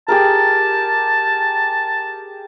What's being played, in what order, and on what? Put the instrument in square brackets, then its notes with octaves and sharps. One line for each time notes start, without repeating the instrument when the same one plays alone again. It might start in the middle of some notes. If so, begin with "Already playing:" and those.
[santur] G4 G#4 A#4 [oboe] A5